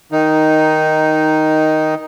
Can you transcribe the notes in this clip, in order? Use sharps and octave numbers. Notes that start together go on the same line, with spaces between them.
D#3 D#4